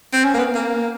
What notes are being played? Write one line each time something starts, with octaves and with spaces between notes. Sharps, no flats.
C4
C#4
A#3
B3
A#3